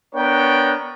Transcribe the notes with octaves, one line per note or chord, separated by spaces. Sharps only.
B3 D4 A#4 C#5 G5